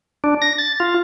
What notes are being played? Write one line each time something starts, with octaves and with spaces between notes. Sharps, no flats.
D4
A#6
A6
F4